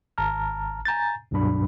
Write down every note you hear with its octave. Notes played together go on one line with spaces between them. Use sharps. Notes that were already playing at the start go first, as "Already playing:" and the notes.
G#1 A5 A#5 F6
G#5 A#5 G6 A6
C#2 G2 B2 F#3 D4 B5